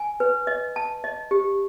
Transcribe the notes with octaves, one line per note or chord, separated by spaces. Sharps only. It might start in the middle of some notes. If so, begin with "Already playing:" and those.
Already playing: G#5
B4
D#5
A5
D#5
G4